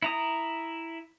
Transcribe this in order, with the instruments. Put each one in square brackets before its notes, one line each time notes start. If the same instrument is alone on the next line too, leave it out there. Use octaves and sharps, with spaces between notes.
[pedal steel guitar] E4 A#5 D#6